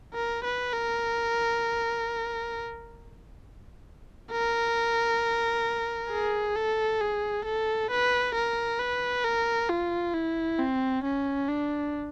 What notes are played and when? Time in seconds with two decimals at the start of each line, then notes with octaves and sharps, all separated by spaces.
0.14 A#4
0.44 B4
0.74 A#4
4.32 A#4
6.11 G#4
6.56 A4
7.01 G#4
7.46 A4
7.91 B4
8.35 A#4
8.80 B4
9.25 A#4
9.69 F4
10.14 E4
10.59 C4
11.04 C#4
11.49 D4